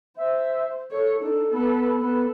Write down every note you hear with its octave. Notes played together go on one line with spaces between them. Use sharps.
C5 E5
A4 C#5
D4 D#4 A4
B3 A4 B4
B3 A4 B4